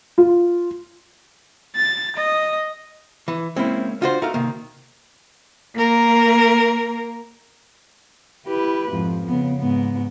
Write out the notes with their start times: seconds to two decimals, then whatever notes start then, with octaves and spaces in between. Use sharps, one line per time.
0.18 F4
1.76 A6
2.16 D#5
3.28 E3
3.56 G#3 A#3 C4 C#4 E4
4.02 D4 F4 F#4 C5
4.22 A3 D#4 F#4 A#4 F5
4.34 C3 D#3 A#3
5.78 A#3 A#4
8.46 E4 G4 B4
8.92 F2 G#2
9.28 C#3 B3
9.59 G#2 B3